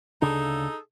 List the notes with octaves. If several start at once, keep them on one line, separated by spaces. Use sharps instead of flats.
D2 C#3 D4 D#4 G#4 A4